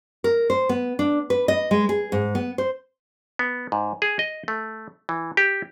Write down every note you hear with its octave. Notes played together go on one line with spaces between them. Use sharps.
A#4
C5
B3
D4
B4
D#5
G#3
G#4
G#2
B3
C5
B3
G#2
G#4
D#5
A3
E3
G4